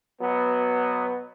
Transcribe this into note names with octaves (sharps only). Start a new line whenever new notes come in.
B2 F#3 B3